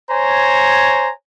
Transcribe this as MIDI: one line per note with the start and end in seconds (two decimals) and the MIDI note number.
0.11 1.11 72
0.11 1.11 73
0.11 1.11 80
0.11 1.11 82